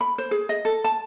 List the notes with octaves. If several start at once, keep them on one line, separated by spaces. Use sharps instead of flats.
B5
C5
G#4
D#5
A4
A5